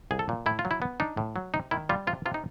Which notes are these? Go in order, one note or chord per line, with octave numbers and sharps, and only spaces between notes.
C2 G#4
A4
A#2
A2 E4
F4
F#3
E4
B3
D4 D#4
A2
F#3
C3 D#4
D#3 E4
G3 F4
C3 F4
C3 F4
D#4